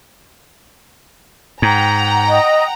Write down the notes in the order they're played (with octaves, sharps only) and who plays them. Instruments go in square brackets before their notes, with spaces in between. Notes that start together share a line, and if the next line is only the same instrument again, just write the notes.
[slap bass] G#2 [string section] F#5 G5 A#5
[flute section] D#5